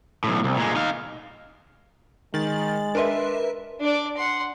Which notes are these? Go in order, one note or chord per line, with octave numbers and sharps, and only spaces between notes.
B1 A2
C2
A#2 G#3
D#4 F5
D#3 G#3 A6 F#7
D4 A#4 B4 E5 C6
D4 D5
F#5 C6